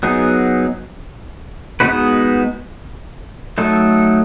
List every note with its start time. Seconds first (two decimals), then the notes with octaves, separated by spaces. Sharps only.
0.03 F#3 B3 D#4 G#4
1.80 G#3 B3 D#4 F#4 B4
3.58 F#3 A3 D#4 A4